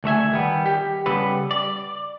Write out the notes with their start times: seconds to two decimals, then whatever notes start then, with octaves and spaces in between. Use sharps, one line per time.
0.04 D2 A3 E5 G#5
0.32 D#3 G3 B3
0.66 G4
1.06 C#3 G3 B3 A4 B4
1.51 D5